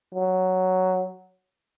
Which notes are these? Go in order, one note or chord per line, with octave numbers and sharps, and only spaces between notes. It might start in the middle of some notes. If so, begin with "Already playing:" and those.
F#3